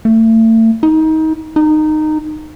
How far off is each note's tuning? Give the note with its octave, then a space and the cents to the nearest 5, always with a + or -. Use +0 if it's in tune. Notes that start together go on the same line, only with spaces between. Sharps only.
A3 +35
D#4 +25
D#4 -15